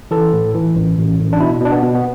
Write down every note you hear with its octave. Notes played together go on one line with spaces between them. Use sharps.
E3 A4
A2
E3
A1
A1
A1
D4
B2 E4
B2 D4
B3
B2
B3